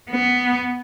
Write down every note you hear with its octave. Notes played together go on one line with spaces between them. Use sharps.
B3